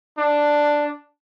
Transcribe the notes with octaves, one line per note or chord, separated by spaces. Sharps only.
D4